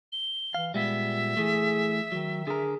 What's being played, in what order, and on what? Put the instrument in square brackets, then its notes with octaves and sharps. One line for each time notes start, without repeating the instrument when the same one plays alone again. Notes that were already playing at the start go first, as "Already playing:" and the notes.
[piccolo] G7
[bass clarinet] E3 [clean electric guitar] F5
[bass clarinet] A#2 [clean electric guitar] G3 G#3 B3 [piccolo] E5
[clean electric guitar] E3 A3 [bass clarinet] G#4
[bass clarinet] D#3 [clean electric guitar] F#3
[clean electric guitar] D3 A#4 [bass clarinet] G#4